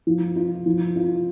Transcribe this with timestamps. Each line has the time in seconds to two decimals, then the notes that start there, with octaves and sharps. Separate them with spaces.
0.07 F3
0.36 F4
0.66 F3
0.96 F4